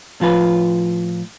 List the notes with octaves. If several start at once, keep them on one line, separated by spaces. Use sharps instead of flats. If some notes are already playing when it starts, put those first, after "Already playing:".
A2 F3 F4 B4